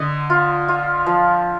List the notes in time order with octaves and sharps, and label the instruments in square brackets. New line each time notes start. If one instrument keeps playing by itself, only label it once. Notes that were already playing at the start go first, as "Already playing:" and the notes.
Already playing: [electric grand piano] D3 [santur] D#5
[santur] F4
F4
F3